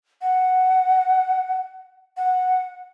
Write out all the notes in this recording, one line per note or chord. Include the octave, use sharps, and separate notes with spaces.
F#5
F#5